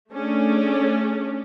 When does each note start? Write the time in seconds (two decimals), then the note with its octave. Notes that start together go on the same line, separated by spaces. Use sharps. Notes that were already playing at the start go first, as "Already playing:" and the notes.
0.12 A3 C#4 D4 G#4